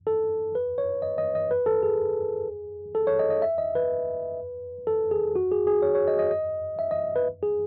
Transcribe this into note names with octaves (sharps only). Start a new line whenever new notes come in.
A4
B4
C#5
D#5
D#5
D#5
B4
A4
G#4
A4
C#5
D#5
D#5
E5
D#5
B4
A4
G#4
F#4
G#4
G#4
C#5
C#5
D#5
D#5
D#5
E5
D#5
B4
G#4